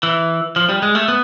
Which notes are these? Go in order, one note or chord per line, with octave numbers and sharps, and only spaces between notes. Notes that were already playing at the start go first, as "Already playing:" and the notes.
E3
F3
G3
G#3
A3
B3